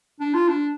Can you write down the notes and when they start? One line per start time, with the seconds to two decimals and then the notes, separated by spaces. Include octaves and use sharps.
0.20 D4
0.34 F4
0.48 D4